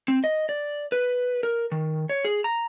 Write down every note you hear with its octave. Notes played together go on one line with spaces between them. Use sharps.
C4
D#5
D5
B4
A#4
D#3
C#5
G#4
A#5